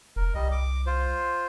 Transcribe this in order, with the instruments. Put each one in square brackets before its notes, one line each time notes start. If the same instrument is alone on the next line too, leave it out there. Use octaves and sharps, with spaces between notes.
[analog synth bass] F1 [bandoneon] A#4
[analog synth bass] C2 [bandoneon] G3 D#5
[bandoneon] D6
F4 C5